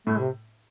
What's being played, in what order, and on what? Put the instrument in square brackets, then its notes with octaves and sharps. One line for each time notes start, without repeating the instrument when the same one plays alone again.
[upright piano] A2 [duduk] A3
[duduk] C3